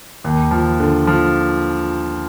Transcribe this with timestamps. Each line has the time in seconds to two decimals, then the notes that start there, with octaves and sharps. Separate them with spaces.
0.24 D#2
0.51 F3
0.80 D3
1.07 F3